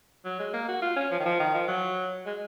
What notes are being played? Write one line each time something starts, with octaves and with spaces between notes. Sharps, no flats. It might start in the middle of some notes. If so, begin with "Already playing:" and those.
F#3
G#3
A#3
F#4
F4
C#4
F3
D#3
F3
D#3
F3
F#3
G#3